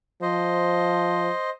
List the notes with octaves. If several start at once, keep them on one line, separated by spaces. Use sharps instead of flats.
F3 C5 D#5